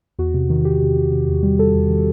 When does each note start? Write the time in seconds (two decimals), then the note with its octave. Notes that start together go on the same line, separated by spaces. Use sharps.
0.19 E2 F#4
0.34 C3
0.50 D#3
0.65 D#3 G4
0.81 C3
0.96 C3
1.12 C3
1.28 E2
1.43 G3
1.59 G3 A4
1.74 E2
1.90 D#3